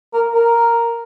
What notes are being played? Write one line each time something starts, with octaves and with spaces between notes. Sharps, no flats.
A#4
A#4